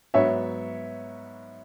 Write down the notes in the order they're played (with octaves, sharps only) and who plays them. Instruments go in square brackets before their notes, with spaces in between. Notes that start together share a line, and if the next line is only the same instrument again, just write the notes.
[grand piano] G#2 F#3 B3 [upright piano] C#5 E5